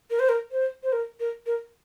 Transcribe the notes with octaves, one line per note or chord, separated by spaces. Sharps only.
A#4
C5
A#4
C5
C5
A#4
A#4
A#4